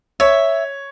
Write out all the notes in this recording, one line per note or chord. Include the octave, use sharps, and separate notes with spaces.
C#5 E5